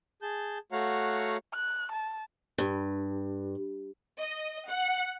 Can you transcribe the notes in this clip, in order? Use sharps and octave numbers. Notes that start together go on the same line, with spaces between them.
G#4 A5 G6
A3 F#4 C#5 F5 F#5 A#5
F#6
A5
G2
D#5
F#5